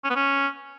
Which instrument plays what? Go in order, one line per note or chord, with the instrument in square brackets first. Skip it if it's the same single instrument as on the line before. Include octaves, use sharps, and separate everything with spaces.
[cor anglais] C#4
B3
C#4